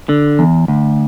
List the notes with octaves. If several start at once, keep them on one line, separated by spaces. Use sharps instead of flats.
D3
E2
D2